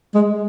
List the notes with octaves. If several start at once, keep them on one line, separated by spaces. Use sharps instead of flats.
G#3